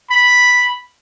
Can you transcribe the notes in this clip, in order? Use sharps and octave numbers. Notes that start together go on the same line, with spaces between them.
B5